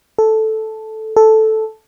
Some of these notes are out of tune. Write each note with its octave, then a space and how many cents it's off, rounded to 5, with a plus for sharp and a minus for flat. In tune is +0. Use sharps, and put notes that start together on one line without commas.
A4 -5
A4 -5